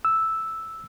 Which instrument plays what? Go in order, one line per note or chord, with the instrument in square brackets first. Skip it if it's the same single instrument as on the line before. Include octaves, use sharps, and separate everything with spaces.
[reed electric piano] E6